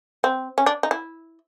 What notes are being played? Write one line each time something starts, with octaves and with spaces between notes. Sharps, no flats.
C4
C#4
D4
D#4
E4